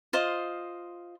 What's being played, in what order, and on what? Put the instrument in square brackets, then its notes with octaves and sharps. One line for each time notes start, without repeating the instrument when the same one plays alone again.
[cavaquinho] F4 C5 D#5